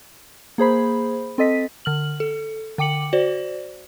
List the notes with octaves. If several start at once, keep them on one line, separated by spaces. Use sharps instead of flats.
A#3 G#4 C5 B5
C4 A4 D#5 B6
D3 F6 F#7
A4
D3 G5 D6 C#7 F#7
F#4 C5 D5